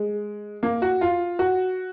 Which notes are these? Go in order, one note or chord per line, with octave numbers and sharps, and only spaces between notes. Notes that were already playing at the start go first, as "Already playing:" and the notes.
Already playing: G#3
A#3
F#4
F4
F#4